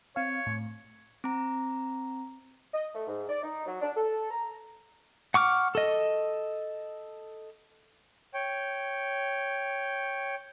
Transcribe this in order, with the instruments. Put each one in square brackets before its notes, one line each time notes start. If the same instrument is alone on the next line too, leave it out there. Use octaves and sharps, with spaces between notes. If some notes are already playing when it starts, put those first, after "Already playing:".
[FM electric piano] C4 F5 [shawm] C#5
[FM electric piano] A2
[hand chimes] C4 A#5
[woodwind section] D#5
A3
G#2
D5
D#4
F#3
D4
A4
A#5
[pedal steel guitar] F#5 C#6 D6 F6
A4 D#5
[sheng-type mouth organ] C#5 G5